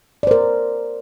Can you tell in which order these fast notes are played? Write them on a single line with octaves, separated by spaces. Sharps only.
D5 C5 A#4